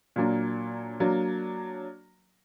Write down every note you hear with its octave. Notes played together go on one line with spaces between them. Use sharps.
A#2 F#3 A#3 D4
F#3 A#3 D4